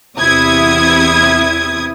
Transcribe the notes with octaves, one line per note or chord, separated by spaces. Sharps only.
E2 C3 E4 D#6 G#6